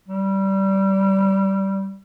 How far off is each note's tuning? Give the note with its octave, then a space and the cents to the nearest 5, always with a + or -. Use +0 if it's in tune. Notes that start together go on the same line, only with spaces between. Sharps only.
G3 -15